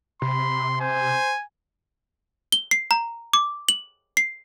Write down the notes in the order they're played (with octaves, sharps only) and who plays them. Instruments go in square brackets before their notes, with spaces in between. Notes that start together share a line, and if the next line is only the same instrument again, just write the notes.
[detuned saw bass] C3 [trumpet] B5 [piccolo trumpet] C6
[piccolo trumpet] C5 [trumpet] G#5
[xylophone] G7
C7
A#5
D6
F#7
C7